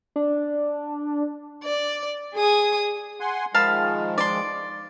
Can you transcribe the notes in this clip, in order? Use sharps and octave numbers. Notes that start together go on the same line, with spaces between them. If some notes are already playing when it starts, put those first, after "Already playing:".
D4
D5
G#4 G#5 D#6
F#5 G#5 C6
D#3 F3 G#3 F5 A5 B5
D5 C6